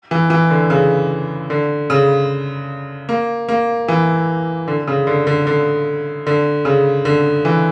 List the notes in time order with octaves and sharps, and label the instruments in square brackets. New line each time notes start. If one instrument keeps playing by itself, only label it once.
[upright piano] E3
E3
D3
C#3
D3
C#3
A#3
A#3
E3
D3
C#3
D3
D3
D3
D3
C#3
D3
E3